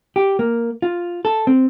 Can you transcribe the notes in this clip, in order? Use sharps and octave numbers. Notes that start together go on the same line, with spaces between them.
G4
A#3
F4
A4
C4